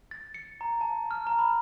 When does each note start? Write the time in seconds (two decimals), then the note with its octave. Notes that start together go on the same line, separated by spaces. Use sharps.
0.11 A6
0.34 C#7
0.61 A#5
0.81 A5
1.11 F6
1.27 A#5
1.39 B5